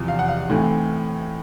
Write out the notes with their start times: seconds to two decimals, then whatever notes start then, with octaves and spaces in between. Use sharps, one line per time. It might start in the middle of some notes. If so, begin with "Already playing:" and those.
Already playing: E2 C3 F3
0.08 F5
0.19 F#5
0.28 F5
0.50 A2 E3 A3 C4